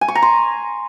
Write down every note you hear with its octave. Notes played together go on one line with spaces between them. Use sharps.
G#5
C#6
A#5
C6